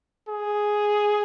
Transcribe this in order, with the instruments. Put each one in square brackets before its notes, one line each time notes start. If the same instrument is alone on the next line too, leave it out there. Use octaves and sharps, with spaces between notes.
[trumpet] G#4